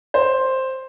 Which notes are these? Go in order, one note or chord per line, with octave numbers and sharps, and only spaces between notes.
C5